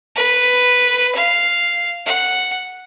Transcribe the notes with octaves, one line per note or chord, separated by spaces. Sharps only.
B4
F5
F#5